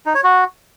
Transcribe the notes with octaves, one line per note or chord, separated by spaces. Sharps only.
D#4
C#5
F#4